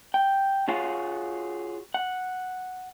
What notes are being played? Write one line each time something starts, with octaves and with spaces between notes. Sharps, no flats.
G5
F4 F#4 G#4 C#5 F5 F#5
F#5